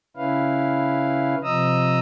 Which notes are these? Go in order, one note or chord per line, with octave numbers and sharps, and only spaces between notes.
C#3 C#4 E4 B4 F5
C3 F3 D#5 A#5 D#6 E6